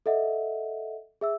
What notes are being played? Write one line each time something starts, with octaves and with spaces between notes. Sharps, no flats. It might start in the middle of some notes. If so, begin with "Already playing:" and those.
A4 D#5 E5 F#5
G#4 E5 E6